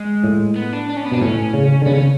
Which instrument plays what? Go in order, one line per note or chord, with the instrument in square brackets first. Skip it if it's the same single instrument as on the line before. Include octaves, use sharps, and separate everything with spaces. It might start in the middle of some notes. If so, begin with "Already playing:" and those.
Already playing: [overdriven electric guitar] G#3
[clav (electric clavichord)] A2
[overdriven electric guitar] B3
D4
D4
C#4
B3
[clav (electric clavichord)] B2 [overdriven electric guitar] D4
[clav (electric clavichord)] A2 [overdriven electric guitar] C#4
[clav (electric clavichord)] C#3
D3
[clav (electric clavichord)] C#3 [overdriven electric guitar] B3
[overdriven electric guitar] C#4